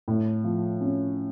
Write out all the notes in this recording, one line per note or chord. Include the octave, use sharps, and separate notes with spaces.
A2
F3
C#4